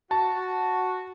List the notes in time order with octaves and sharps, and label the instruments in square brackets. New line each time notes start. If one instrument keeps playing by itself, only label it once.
[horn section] F#4 [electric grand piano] A5